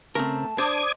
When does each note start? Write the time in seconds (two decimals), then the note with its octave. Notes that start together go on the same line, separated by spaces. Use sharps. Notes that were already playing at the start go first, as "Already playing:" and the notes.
0.15 C#3 A3 C4 A#4 A5
0.58 D4 C5 D5 D6 D#6 G#6